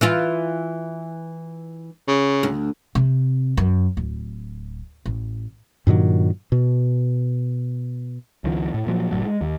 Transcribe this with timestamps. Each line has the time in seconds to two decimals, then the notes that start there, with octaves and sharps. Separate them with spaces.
0.01 E3 E4 F4
2.08 C#3
2.43 D2
2.95 C3
3.57 F#2
3.97 D1
5.06 A1
5.87 G2 A#2 D#3 F#3
6.52 B2
8.44 C#2 D#3 F3
8.74 A2
8.87 A#2 F3 F#3
9.11 F#1 D#2 A2 F#3
9.24 G#3
9.41 D#2